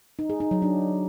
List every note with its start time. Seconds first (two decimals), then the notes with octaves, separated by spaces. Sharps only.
0.19 D#4
0.30 G#4
0.40 D#4
0.51 F#3
0.62 D4